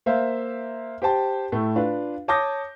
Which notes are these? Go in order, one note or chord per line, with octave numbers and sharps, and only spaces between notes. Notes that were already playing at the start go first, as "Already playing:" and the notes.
A#3 C5 E5 F5
G4 C5 G5 A5
A2 A3
D4 F4 B4
C#5 A5 D6 D#6 G6 A#6